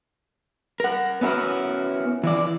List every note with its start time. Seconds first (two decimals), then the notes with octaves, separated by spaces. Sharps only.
0.80 A#4 F#5
1.21 B3 C#4 E4 F#4 A#4
2.23 E3 E4 D5